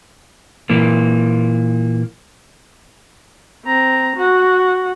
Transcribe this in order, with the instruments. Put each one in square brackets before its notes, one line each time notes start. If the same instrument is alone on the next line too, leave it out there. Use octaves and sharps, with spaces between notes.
[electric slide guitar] A#2 E3 A#3
[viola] C4 A#5
F#4 F#5